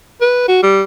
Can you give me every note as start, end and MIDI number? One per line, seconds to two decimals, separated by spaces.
0.21 0.45 71
0.48 0.58 66
0.63 0.82 55